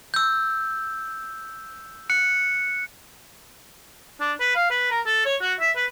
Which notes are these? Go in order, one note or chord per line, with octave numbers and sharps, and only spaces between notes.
E6 G6
F#6 C#7
D4
B4
F5
B4
A#4
A4
C#5
F#4
E5
B4